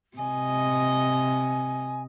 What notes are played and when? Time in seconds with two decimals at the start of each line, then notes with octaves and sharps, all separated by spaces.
0.18 C3 D#5 G#5